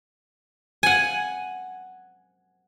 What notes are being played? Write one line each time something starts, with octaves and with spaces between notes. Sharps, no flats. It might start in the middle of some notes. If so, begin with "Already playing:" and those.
F#5 G#5